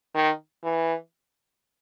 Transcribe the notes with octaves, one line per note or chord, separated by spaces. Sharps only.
D#3
E3